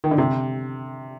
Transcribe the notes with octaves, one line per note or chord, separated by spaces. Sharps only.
D#3
D3
C3